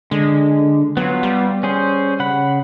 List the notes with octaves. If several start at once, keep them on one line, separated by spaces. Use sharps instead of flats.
D3 G#3
F#3 B3 F4
G3
C#4 G#4 C5
C#3 F#5 B5